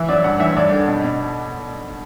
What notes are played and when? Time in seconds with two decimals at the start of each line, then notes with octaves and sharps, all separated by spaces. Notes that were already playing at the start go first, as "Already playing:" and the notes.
Already playing: E3 E5
0.09 F#2 D5
0.24 G2 F#5
0.40 E3 E5
0.56 G2 D5
0.72 D3
0.88 B2
1.04 B2